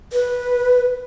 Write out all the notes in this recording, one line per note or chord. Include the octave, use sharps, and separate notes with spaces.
B4